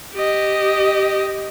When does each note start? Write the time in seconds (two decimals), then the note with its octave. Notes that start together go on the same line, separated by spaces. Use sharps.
0.14 G4 D#5